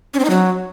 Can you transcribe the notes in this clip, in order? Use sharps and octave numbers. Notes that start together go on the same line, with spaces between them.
C#4
C4
D#4
F#3